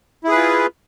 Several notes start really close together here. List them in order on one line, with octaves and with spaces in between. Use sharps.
E4 G#4 B4 F4